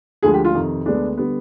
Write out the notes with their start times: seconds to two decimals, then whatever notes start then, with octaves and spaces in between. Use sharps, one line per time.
0.23 D2 D3 F3 G#3 G#4
0.34 G4
0.45 F4
0.55 F2 C3 D#3
0.86 D2 D3 G#3 B3 D4
1.18 D3 G3 B3